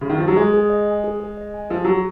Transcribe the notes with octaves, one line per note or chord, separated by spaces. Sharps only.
C#3
D#3
F3
F#3
G#3 G#4
G#4
D#5
G#5
G#4
G#4
D#5
G#5
F3 G#4
F#3 G#4